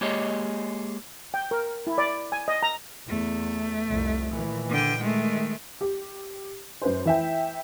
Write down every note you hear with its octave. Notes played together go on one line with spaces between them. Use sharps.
G#3 A#3 G4 G#4 C#5 D#5
G5
A#4
E4
D5
G#5
D#5
A#5
E2 A3
C2 F2
A#2 D#3 E3
D3 G5
D#3 G#3 A3
G4
F#2 B4 C5
E3 E5 G5